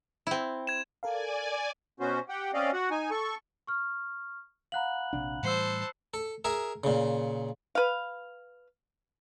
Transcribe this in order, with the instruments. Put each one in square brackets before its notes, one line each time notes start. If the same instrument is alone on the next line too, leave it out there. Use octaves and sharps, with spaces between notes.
[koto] C4 E4
[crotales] G#6 E7
[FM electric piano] A4 A#4 F5 [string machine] D5 G#5
[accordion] B2 B3 C#4 F#4 C5
G4 F#5 G5
C4 C#4 D5 D#5 F5
F#4 F#5
D#4 G#5
A4 C#6
[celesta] C#6 F6
[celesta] F5 F#5 A#5 [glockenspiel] B5 F#6 F#7
[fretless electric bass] A#1 C3 D4
[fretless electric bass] A2 E3 G3 [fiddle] C5 A5 [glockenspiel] E6 C7 C#7
[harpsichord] A4
G#4 A#4 E5
A#2 C#3
[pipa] B4 F5